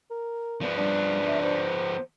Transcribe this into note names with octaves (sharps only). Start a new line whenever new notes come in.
A#4
F3 B3 D5
G3 D4
E5
C5